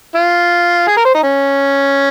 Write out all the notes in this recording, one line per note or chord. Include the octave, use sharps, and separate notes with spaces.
F4
G#4
A#4
C5
D#4
C#4